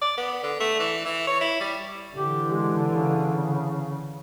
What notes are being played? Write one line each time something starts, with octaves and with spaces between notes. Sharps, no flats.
D5
B3
D3
A3
E3
E3
C#5
E4
G3
D3 E3 G4
G#3
C#3